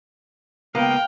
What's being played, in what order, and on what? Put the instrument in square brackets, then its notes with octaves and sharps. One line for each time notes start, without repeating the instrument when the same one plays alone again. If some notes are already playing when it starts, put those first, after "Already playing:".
[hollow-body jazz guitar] C#2 A#3 B3 [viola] F5 G5